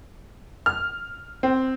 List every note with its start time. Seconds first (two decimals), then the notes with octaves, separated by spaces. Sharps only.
0.66 F6
1.43 C4